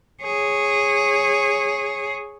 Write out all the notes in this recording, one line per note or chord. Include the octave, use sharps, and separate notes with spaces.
G#4 C#5